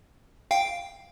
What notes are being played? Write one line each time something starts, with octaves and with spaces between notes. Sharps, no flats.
F5 G5